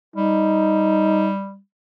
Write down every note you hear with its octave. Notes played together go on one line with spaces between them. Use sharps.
G3 D#4